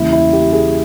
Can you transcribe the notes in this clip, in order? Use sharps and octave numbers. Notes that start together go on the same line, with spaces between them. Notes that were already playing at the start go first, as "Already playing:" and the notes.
Already playing: E2 C#3 G3 A#3 E4
E4
G4
G#4